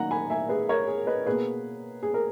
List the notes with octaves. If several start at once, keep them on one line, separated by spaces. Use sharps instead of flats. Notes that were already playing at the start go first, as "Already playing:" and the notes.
Already playing: D#3 F#3 A#3 F#5 A#5
G#5 B5
E5 G#5
G#4 B4
A#4 C#5
G#4
B4 D#5
B2 A#3 G#4 B4
G#4
A#4